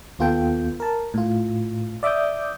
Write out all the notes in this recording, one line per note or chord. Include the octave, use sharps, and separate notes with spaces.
D#2 B3 F4 A4 G5
A#4 A5
A2 F4
D5 E5 D6 D#6 G6